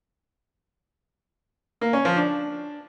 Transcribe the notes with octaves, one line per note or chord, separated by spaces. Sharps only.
A#3
C#4
F3
D4